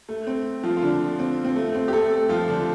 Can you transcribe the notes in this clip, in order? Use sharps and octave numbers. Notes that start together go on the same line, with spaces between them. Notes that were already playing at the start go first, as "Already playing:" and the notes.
A3
C4
F3 F4
F4
D3 D4
C4
C4
A3
C4
G4
A3 A4
F3 F4
D3 D4